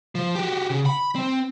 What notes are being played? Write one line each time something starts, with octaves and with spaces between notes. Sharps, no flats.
F3
F#4 G4
C#3
B5
C4